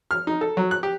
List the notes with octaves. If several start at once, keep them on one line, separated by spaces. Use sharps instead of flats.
F6
D#4
A4
F#3
F#6
G4